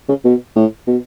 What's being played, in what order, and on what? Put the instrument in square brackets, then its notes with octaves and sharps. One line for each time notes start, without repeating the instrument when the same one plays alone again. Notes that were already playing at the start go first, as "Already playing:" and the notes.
[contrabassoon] C#3
B2
A2
B2